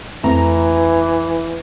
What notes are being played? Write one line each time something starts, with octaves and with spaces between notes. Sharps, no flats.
F2 E3 A3 A#5